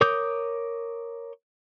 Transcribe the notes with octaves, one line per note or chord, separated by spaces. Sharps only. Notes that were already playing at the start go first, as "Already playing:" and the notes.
A#4 C#5 D6 D#6 G6